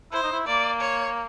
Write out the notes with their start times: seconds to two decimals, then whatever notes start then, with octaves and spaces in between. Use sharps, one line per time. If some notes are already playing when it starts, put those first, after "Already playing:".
0.12 E4 C5
0.23 D#4
0.32 E4
0.46 A#3 D5
0.80 C#5